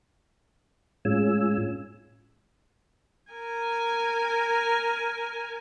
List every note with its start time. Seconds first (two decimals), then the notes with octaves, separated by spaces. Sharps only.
1.05 A2 G#3 C#4 F4 G#5 E6
3.32 A#4 G#5